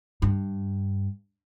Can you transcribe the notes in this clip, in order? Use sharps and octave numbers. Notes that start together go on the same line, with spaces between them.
G2